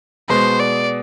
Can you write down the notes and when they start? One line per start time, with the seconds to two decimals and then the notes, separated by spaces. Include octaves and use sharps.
0.29 B2 G#3 B3 C5
0.59 D5